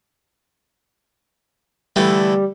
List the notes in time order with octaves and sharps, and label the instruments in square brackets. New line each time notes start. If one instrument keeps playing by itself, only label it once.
[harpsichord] D3 E3 A3 [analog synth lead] G3